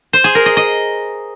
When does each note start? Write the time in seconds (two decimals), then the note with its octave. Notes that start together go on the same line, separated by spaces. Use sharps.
0.13 C5
0.24 G#4
0.35 A#4
0.46 D#5
0.57 D#5